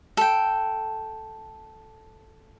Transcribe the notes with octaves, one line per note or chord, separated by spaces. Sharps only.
A4 G5